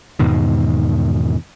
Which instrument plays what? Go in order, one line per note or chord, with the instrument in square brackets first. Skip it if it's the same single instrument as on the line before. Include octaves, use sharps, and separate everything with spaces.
[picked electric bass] E2 G#2 B2 D#3